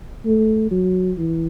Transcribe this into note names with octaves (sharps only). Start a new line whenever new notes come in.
A3
F#3
E3